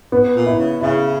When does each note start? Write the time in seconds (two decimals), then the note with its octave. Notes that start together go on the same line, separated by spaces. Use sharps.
0.12 B3
0.35 A#2
0.46 E4
0.57 C#3
0.80 C#3 E4